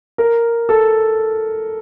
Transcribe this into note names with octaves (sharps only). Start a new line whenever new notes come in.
A#4
A4